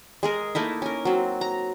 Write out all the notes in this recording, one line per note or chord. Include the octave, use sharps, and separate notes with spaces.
G#3 G#4 A#4
A3 A#3 D#4 E4
C#4 A#4
F#3 C4
A#5